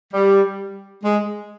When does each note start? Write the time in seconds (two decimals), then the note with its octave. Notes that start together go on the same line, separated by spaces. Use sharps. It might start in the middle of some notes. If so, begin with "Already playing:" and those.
0.13 G3
1.04 G#3